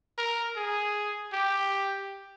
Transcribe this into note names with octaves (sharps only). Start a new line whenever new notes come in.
A#4
G#4
G4